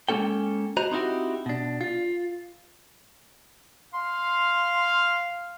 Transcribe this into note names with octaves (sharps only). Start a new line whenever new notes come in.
G#3 A#3 C#4 A4 G5
F#4 C5 D#5 A#5 B5
C4 D#4 E4 F#4 G4
B2 D4
F4
F5 C6